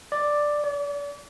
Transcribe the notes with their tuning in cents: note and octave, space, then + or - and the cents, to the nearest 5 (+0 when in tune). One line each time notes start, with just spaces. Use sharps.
D5 +5
D5 -40